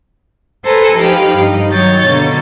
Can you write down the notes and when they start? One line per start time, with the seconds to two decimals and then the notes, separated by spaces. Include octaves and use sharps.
0.64 A4 B4 C5 G#5 A#5
0.96 F3 D#4 G4 F5 G5 B5
1.35 G2 D#4
1.69 D#3 F#3 C#5 G6 A6
2.06 B2 D3 A#3